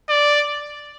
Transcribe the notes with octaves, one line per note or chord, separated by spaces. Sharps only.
D5